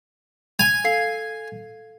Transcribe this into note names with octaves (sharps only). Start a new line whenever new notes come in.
G#5 F7
A4 F5 C7